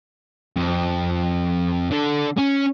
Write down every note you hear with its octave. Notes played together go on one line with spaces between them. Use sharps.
F2
D3 A4
C#4